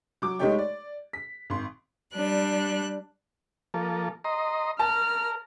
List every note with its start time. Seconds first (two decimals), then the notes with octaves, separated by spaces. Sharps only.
0.22 F#3 D6
0.39 G#3 A3 D#4 G4 C#5 G5
0.58 D5
1.13 B6
1.50 G#1 C6
2.13 G3 D4 F#6
3.74 F3 A#3 A4
4.24 D#5 A#5 C6
4.79 A#4 A5 F6